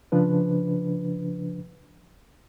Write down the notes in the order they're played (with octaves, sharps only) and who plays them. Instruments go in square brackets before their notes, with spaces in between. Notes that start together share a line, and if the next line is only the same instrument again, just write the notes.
[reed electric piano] C#3 F3 D4 B4